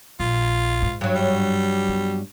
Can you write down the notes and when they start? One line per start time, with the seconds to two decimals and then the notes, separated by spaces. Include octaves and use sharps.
0.20 A#1 F4
0.82 G#2
1.01 G2 F#3
1.15 G3
1.89 B3